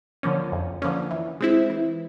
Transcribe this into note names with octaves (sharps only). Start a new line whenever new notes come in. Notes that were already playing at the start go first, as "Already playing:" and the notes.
D3 F3 A#3 C#4
F2
D3 F3 A#3 C#4
E3
G#3 C4 E4
E3